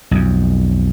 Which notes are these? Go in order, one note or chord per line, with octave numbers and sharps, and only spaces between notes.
B1 F2